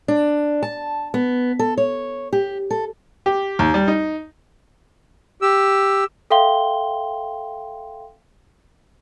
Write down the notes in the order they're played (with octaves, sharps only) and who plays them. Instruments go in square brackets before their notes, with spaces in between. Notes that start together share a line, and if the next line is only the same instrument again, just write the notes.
[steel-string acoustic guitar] D4
A5
B3
A4
C#5
G4
A4
[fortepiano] G4
D#2
G3
D#4
[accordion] G4 E6
[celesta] A4 E5 F5 G5 C6 G7